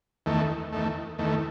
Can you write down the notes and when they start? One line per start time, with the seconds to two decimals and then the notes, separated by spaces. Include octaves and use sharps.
0.26 E2 D#3 A3
0.72 E2 D#3 A3
1.18 E2 D#3 A3